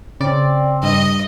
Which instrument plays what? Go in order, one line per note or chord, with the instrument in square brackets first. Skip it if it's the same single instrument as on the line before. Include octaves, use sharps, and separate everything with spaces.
[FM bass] C#3 [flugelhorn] C4 [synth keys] D5
[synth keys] G2 [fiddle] D#5